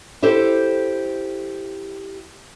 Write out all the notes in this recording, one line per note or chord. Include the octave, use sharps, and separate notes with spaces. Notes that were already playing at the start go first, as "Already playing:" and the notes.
E4 G4 A4 C5